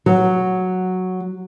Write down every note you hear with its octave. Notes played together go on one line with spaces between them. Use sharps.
F#3